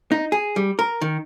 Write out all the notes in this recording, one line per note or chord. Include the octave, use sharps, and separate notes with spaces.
D#4
G#4
G3
A#4
D#3